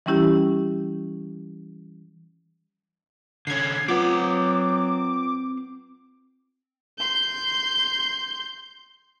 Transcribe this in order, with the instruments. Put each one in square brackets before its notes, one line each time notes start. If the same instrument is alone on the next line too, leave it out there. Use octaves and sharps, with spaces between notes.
[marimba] E3 G3 C#4 E4 G4
[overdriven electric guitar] D3 C#4 [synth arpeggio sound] G#6 C7
[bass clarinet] F#3 [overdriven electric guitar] C4 F#5 [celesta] F4 B4 [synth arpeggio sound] D6
[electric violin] C6 G6